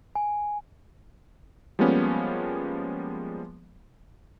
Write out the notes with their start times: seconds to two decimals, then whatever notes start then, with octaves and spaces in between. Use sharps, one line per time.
0.15 G#5
1.79 F3 G3 G#3 A#3 B3 C#4